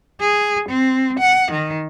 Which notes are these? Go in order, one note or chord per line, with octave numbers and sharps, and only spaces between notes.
G#4
C4
F#5
D#3